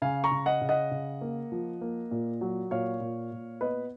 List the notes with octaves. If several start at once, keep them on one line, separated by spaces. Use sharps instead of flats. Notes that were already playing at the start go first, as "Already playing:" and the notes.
C#3 F5 G#5
A#5 C#6
C#3
D#5 F#5
C#3
D#5 F#5
C#3
A#3
F3
A#3
A#2
F#3
A#2 C#5 F5
A#2
A#2
B3 B4 D#5